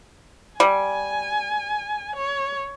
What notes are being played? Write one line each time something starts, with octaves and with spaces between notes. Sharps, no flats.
G3 G#5
C#5